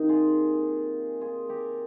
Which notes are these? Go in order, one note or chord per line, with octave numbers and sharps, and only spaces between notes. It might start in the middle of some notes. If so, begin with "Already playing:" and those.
Already playing: C3 D#3 A#3 D#4
F4 G#4
F4 G#4
G4 A#4